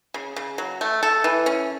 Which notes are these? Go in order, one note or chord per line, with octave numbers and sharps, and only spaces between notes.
C#3
C#3
F#3
A3
A4
E3
C#4